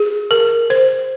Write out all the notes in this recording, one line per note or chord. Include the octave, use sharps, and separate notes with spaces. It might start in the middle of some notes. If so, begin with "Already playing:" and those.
Already playing: G#4
A#4
C5